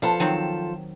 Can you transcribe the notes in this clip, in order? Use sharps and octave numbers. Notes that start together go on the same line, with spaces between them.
F3 B3 A4
D#3 F#3 C4